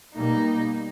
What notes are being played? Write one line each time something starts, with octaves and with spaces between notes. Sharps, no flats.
B2 G3 A#3 D#4